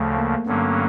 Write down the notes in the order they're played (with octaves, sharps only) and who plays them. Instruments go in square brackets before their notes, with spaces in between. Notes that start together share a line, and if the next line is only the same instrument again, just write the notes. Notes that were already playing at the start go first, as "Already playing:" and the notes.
Already playing: [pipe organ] D2 C#3 F3 [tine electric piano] A3
[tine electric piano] A#3
[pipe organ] G2 D3 F#3 A#3 C#4 [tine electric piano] B3